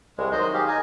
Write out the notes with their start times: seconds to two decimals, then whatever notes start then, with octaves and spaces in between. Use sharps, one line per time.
0.18 C2 G#3
0.32 D#3 F#3 C5 D#5
0.54 G4 G#4 F5
0.68 D#4 D#5 G#5